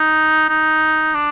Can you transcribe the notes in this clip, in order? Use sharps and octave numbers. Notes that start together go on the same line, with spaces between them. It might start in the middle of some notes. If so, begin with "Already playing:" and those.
Already playing: D#4
D#4
D4